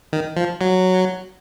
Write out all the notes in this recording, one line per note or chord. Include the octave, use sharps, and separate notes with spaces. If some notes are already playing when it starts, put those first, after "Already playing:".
D#3
F3
F#3